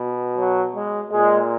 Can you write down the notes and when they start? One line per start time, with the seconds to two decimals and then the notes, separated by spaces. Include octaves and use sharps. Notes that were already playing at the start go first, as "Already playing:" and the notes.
Already playing: B2
0.37 F#3
0.74 G#3
1.11 A#2 G#3